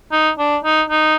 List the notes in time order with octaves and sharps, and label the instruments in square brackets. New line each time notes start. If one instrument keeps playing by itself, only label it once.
[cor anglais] D#4
D4
D#4
D#4